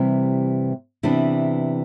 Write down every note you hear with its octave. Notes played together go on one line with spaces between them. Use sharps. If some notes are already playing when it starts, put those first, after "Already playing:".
Already playing: C3 E3 G3
C3 E3 B3 D4